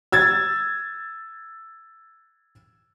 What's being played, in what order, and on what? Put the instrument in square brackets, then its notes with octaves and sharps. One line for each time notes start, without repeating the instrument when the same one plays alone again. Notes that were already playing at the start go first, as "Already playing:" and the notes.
[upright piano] E6 G#6 A6